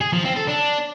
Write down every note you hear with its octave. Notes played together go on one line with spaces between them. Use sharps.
G#4
F3
C4
A4
D4